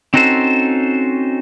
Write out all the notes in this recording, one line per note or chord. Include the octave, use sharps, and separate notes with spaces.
C4 C#4 D#4 F#4 A4 C5